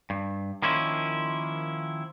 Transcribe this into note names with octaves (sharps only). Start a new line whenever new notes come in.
G2
D#3 F3 A#3 C#4 E4